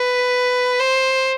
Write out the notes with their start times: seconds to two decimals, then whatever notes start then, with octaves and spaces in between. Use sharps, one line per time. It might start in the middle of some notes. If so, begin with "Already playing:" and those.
Already playing: B4
0.79 C5